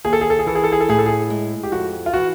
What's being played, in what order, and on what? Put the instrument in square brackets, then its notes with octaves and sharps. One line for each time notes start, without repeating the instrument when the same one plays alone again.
[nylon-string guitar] D#2 [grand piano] G#4
[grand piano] A4
G#4
A4
G#4
[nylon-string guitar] E3 [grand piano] A4
[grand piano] G#4
A4
G#4
A4
[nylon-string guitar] A2 [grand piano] G#4
[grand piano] A4
G#4
[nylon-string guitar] G#3
[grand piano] G4
[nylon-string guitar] F2 [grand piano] F#4
[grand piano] F4
[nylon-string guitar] E3 [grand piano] F#4